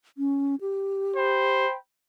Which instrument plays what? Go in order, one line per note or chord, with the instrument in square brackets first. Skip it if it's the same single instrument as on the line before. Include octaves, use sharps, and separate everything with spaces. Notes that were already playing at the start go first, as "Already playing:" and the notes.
[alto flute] C#4
G4
[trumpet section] C5 G5 B5